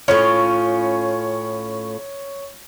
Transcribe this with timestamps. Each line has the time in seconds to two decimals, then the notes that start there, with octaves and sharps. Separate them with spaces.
0.08 A2 C#4 F4 C#5